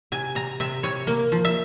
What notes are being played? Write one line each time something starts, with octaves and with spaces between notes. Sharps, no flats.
C3 G#5
C3 A#5
C3 E5
C3 C#5
A#3
F3
E5